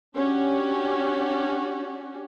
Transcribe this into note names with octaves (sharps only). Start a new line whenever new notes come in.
C#4 D4 F#4 G4